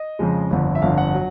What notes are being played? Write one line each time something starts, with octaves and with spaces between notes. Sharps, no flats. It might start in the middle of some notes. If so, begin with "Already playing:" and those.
Already playing: D#5
F2 C#3 F3 G#3
G1 F2 D3
E5
G1 F2 D3 F5
F#5
F#3